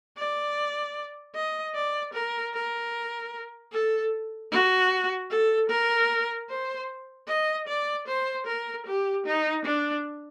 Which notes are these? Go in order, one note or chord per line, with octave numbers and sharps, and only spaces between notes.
D5
D#5
D5
A#4
A#4
A4
F#4
A4
A#4
C5
D#5
D5
C5
A#4
G4
D#4
D4